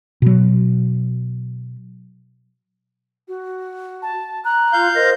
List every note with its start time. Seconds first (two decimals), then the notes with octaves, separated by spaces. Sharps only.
0.22 B2 F#3
3.28 F#4
4.02 A5
4.45 A#5 F#6
4.73 F4 F5 G6
4.95 A#4 C5 D#5 A#6